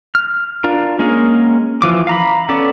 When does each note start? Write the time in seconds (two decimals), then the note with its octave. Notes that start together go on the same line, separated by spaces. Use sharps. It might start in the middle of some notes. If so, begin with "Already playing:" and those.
0.15 F6
0.64 D4 F4 A#4
0.99 G#3 A#3 C#4 G#4 A#4
1.82 E3 F3 D6
2.07 F5 A#5 B5
2.49 B3 C#4 A4 D5 D6